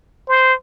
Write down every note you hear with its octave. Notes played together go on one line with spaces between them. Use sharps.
C5